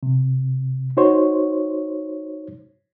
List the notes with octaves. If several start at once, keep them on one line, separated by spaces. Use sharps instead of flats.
C3
D#4 F#4 C5 C#5